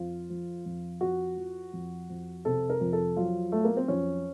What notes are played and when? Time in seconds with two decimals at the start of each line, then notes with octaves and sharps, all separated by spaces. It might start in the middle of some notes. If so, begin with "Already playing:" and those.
Already playing: F2 F3 F4
0.30 F3
0.65 F2
1.01 F2 F#4
1.37 F3
1.73 F2
2.09 F2
2.45 C3 A4
2.70 A#4
2.80 F2
2.93 A4
3.17 F#3 F4
3.52 F#3 A3
3.64 A#3
3.77 C4
3.88 F2 C#4